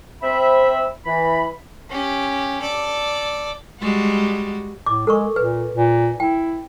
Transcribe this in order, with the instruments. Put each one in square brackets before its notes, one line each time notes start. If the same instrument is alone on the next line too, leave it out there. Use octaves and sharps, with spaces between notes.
[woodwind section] C4 E5 B5
E3 B5
[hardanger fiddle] C#4 G4
A4 D5
[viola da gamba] G3 G#3 F#4
[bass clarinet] A2 [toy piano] D6
[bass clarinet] G#3 [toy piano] A4 A#4 C#6
[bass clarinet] A#2 [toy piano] B4
[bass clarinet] A#2
[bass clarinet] E4 [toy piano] G5